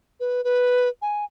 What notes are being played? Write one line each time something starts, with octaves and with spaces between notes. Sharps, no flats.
B4
B4
G#5